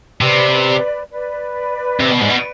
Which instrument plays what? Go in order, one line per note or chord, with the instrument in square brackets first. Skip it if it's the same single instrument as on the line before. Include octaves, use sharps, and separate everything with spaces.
[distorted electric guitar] C3 [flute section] B4 D5
[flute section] B4 D5
[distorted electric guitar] C3
B2
G#2
B2